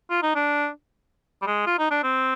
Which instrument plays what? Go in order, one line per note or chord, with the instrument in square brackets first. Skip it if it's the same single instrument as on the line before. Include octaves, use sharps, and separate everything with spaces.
[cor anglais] F4
D#4
D4
G3
G#3
F4
D#4
D4
C4